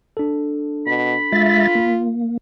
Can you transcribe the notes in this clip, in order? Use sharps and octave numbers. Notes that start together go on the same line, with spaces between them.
D4 A4
B2 B5
G#3 F4 E5 A6
A#3